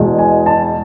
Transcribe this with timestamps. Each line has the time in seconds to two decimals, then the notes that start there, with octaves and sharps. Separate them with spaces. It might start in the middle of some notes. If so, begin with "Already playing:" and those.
Already playing: E2 B2 G#3
0.18 G#5
0.46 A5